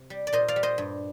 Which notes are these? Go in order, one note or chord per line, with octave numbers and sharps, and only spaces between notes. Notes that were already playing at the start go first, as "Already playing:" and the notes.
Already playing: C3
G3
D5
A#2 C5 D#5
D5 F5
G3
C5 D#5
G2